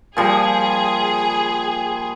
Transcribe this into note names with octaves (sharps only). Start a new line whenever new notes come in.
A#2 F3 G3 G#4